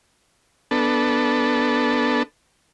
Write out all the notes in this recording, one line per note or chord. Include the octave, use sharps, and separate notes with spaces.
B3 D4 A4